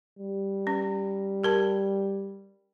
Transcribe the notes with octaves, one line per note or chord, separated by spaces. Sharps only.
G3
C#4
G4 A#4 A5